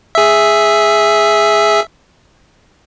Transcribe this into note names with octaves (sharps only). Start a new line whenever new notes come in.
G#4 E5